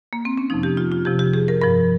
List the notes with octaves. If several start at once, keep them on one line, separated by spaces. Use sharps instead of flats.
A#3
C4
C#4
F2 C3 F3 D#4
G4
F4
F4
F2 C3 F3 G4
G4
G#4
A#4
G2 F3 A#4